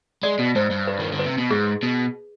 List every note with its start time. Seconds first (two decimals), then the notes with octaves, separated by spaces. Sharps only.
0.23 G#3 D5
0.39 B2
0.55 G#2 C5
0.71 G2
0.87 B4
1.00 D#3
1.12 D3
1.19 B4
1.26 C3
1.38 B2
1.51 G#2 G#4
1.83 B2